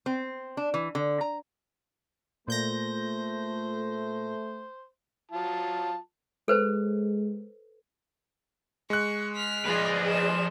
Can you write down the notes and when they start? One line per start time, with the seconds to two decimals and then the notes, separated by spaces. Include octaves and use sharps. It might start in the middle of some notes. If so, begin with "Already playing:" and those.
0.06 C4
0.57 D4
0.74 E3
0.95 D3
1.21 A#5
2.48 A#2 A3 C5 G6 A#6
5.31 F#3 F4 A5
6.48 G#3 A4 B4 C5
8.90 G#3 C#6 F#6
9.36 F6 B6
9.65 F3 G#4 B4 D5 D#5
10.09 E7